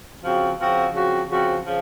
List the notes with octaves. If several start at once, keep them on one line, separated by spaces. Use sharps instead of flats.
C#3 F3 C4 F#4
C#3 F3 C4 F#4
C#3 F3 C4 F#4
C#3 F3 C4 F#4
C#3 F3